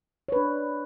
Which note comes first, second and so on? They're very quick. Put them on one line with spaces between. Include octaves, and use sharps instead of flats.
C#5 B4 D4